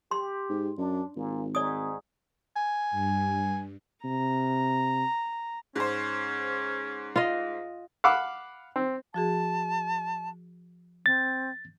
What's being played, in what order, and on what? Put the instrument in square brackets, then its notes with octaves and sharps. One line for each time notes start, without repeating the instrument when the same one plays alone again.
[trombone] G4 [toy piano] C6
[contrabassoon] G#2
[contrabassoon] F#2 [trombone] D4
[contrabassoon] G#1 [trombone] A#2
[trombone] G#2 [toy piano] D5 D#6
[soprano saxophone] G#5
[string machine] G2
[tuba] C3 [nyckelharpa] A#5
[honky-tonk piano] G#2 C5 [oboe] C#4
[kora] F4 D#5
[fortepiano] F5 F#5 B5 D6 E6 F#6
C4
[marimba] F3 F#4 G#4 [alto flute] A5
[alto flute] C4 [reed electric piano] A6